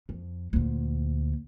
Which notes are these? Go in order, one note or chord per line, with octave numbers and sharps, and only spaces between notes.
F2
D2 A#2